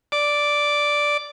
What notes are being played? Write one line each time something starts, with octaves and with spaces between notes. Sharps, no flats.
D5